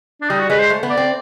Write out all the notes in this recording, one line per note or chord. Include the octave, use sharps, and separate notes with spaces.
D4
G3 D#4
F#4
G#3 B4
C5
A3
B3
D5
C4